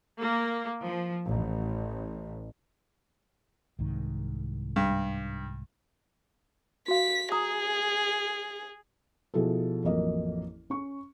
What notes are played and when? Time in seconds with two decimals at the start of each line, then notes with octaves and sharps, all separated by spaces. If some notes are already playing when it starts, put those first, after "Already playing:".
0.20 A#3
0.84 F3
1.28 A1
3.79 C2 G#2 D#3
4.76 G2
6.88 F#4 F5 B6
7.32 G#4 A#5 D#6
9.34 B2 F3 E4 G#4 A4
9.84 A1 F2 F#3 A#3 D#5
10.70 C#4 C#6